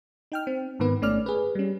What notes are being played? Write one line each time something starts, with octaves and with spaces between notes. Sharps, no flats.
D#4 G5 F6
C4
G#2 D#3 B3 B4
G1 A3 C#4 D5 F6
G#4 B4
G3 C#4